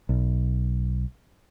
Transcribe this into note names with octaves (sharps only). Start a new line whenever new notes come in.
B1